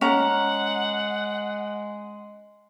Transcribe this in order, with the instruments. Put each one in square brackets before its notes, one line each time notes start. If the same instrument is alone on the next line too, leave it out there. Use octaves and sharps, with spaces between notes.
[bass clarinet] G#3 [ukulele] C#4 A#5 [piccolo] F#5